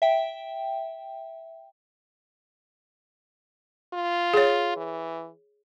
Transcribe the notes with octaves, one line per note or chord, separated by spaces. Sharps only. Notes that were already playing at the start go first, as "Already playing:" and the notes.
E5 G5
F4
G#4 C#5
E3